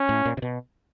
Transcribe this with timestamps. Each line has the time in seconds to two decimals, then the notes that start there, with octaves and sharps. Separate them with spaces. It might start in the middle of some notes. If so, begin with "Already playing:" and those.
Already playing: C#4
0.09 A2
0.25 A#2
0.37 C3
0.42 B2